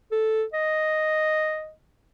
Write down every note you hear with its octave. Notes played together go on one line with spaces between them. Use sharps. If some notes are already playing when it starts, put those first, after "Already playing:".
A4
D#5